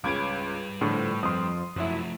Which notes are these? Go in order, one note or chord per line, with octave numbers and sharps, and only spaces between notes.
C#2 G3 C#4 B4 D6 G#6 D7
A2 D3 F3
F2 F3 C6 D#6
F#2 F3 F#3 A3 E4